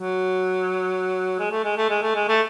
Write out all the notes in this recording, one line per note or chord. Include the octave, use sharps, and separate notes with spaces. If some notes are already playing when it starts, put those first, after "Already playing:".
Already playing: F#3
G#3
A3
G#3
A3
G#3
A3
G#3
A3